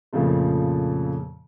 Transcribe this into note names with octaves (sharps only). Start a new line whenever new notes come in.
F2 A#2 C#3 F3 A3